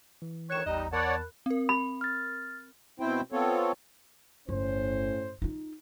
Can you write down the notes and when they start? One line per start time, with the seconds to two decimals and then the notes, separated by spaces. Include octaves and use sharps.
0.22 E3
0.50 D2 D#3 C#5 C#6 F#6 E7
0.66 A1 E2 G3 D#4 D#5
0.93 E2 A#4 C#5 D5 F#5 A5 B5 F#6
1.46 C4 A#4
1.69 B5
2.01 F6 A6
3.00 B2 C4 E4 C5 G5
3.32 B3 C4 F4 A4 C#5
4.49 G1 A2 C#4 C5
5.42 D#4 F4